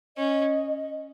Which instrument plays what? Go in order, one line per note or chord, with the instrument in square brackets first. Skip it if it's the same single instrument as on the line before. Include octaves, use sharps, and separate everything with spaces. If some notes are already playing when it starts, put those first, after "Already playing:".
[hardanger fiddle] C#4 [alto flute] D#5